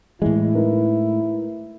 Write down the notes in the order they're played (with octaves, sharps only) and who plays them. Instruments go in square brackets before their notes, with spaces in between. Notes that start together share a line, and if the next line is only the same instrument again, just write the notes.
[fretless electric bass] A2 G#3 [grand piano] E3 [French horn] E4
[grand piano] D#4 A#4 B4